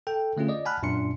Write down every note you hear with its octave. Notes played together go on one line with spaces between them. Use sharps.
A4 G5
D3 A3 C#4 F4 G#4
D5 D#5
F#5 G#5 A5 B5 F6 F#6
F#2 A#2 D4 C6 C#7